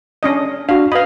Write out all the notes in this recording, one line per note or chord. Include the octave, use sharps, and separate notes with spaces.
C#4 D4 D#5
D4 F#4 F5
B4 D#5 F5 B5